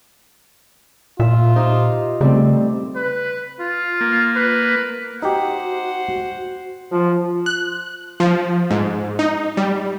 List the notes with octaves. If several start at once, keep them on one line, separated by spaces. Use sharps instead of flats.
A#2 F4 E5
D#4 G4 C5
C#3 G3 A3 C4
B4
F4
A#3
B4
D#4 F#4 G4 C5 F#5
F3
F#6
F3
G#2
D#4
G3